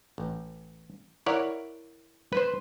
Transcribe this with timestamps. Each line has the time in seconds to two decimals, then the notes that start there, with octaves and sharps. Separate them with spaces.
0.18 A1
1.26 E4 A#4 C#5 D5 F#5
2.33 B4 C5